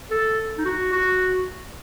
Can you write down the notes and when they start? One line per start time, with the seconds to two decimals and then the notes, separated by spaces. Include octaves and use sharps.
0.11 A4
0.58 D#4
0.65 F#4
0.92 F#4